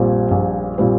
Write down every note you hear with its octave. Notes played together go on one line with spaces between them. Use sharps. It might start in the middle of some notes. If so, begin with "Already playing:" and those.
Already playing: A#1 A#2 G3 C4
A#1
A#2 G3 C4